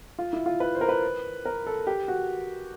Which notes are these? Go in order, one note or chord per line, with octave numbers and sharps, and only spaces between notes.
F4
E4
F4
B4
C5
A#4
B4
A#4
A4
G4
F#4